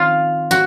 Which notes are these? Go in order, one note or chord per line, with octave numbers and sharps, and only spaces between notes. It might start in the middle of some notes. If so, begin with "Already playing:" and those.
Already playing: D#3 C4 F4
F#4